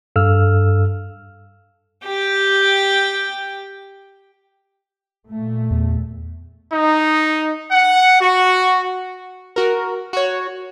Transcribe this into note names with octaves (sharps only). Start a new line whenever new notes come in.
G2 A4 F5 E6 F6
G4 G5
A#2 A3
E2
D#4
F#5
F#4
F#4 A#4
F#4 C#5